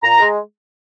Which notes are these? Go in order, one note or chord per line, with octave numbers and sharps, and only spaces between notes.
A#2 A#5
G#3